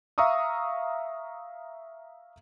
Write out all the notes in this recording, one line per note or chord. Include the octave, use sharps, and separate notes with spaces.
E5 F5 A#5 C#6 D#6 E6